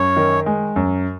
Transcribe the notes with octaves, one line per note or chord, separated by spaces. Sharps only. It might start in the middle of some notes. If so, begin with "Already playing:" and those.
Already playing: F#2 C#5
D#3
G#3
F#2